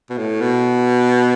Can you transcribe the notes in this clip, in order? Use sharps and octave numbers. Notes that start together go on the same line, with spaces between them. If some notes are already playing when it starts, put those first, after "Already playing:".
B2
A2
B2